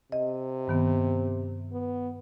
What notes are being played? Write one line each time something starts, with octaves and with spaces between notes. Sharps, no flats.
C3 D#5
G2 D#3 B3
B3